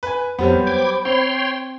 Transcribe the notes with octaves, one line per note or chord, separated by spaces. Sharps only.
B4 G#5
F2 F#3 G3 B3 C5 B5
G5 D6 G#6
C4 C#5 G5 C6